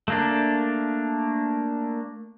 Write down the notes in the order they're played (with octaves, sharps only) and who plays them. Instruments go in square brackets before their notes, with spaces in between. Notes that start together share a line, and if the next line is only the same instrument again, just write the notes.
[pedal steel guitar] A3 A#3 D4